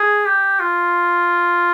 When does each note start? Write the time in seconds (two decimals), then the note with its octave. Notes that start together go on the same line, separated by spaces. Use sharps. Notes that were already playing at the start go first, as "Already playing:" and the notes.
Already playing: G#4
0.26 G4
0.60 F4